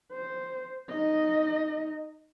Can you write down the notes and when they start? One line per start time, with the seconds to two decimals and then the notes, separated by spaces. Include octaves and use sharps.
0.12 C5
0.89 D#4 D#5